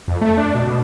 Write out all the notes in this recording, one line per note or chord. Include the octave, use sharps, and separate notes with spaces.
F2
A3
D4
B2
B2